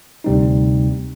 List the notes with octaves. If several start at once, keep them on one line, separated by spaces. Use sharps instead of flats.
D2 C3 G3 C4 D#4